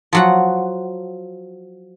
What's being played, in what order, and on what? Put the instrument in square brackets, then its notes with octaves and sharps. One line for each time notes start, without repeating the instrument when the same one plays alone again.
[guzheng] F3 F#3 F#5